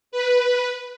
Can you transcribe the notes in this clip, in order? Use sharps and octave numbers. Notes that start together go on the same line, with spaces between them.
B4